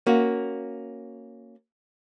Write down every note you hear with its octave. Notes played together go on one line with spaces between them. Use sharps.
A#3 C#4 F#4